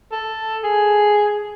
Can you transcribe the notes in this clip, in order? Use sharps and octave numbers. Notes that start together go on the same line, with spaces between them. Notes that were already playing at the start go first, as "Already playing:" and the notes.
A4
G#4